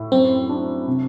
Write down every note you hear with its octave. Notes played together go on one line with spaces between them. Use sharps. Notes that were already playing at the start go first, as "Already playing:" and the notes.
Already playing: A2 E4
F#2 C4
D4
C3